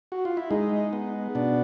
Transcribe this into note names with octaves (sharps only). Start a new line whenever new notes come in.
F#4
F4
E4
G#3 D#4
B3
B2 D4